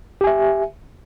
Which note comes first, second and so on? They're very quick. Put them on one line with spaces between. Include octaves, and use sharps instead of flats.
G4 G#5 E5